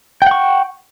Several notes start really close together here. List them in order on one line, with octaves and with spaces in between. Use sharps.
G5 F#5 C#6